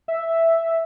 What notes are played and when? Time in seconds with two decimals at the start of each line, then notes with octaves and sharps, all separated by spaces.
0.08 E5